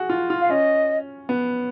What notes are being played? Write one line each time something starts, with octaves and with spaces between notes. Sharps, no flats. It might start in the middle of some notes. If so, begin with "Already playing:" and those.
Already playing: F#4 G#4
F4
F4
F5
C#4 D#5
B3